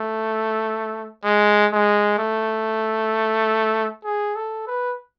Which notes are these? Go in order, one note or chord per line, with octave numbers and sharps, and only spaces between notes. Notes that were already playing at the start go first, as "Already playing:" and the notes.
Already playing: A3
G#3
G#3
A3
G#4
A4
B4